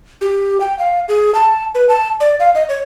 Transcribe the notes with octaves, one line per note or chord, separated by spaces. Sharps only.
G4
G5
F5
G#4
A5
B4
A5
D5
F5
D#5
C#5